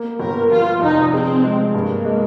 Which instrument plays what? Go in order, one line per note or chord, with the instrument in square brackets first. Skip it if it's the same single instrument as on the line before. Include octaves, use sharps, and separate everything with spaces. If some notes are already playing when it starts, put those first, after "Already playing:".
Already playing: [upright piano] A#3
[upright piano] G1 [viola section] A#4
[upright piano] F3 [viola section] F4
[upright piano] F1 [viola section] D#4
[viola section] C4 [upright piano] G#4
[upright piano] G#3
[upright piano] G2 [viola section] A#3
[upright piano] G#3